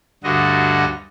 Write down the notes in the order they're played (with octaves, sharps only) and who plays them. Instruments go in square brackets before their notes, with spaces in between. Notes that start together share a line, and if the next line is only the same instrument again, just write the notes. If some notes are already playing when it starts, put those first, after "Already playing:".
[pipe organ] D2 G2 D3 F#4 D#5